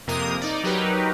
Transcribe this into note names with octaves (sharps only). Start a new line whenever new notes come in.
F2 C3 A#3 A#4 D#6
D#4 D5
F#3 D#4 G4 A#4 B4